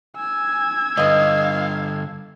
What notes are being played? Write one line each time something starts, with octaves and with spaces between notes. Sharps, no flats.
G#5 E6 G#6
G2 D3 E3 D#5 F5